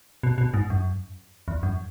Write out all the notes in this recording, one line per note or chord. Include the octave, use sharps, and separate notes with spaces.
B2
B2
G#2
F#2
E2
F#2